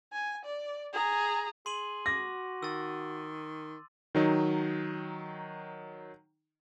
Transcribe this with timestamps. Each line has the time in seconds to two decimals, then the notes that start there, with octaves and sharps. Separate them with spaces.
0.13 G#5
0.45 D5
0.93 G#4 A#5
1.66 G#4 C6 D#7 F#7
2.06 F#4 D6 A#6
2.63 D#3 E6 A6
4.15 D#3 F#3 D#4